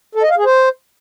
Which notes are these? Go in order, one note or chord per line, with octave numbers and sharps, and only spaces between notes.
A4
D#5
F5
G#4
C5